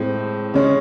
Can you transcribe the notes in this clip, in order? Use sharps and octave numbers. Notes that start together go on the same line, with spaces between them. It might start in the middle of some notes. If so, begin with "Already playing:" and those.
Already playing: A2 G#3 C4
C#3 G#3 C#4